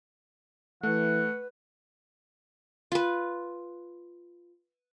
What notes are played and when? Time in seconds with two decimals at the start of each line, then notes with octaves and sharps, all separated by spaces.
0.83 E3 A3 B4 F#5
2.92 F4 B4